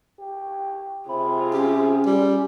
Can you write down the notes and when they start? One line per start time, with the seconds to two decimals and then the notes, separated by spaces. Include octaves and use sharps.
0.19 G4
1.09 C3 F4 G#4 B5
1.54 C#4 G4
2.06 G3